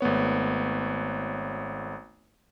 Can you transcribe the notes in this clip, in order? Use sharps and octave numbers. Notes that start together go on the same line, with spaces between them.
G#1 A3 B3 C#5